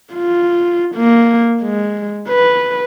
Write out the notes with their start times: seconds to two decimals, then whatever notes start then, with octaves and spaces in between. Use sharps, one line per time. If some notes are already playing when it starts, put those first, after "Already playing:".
0.14 F4
0.96 A#3
1.62 G#3
2.29 B4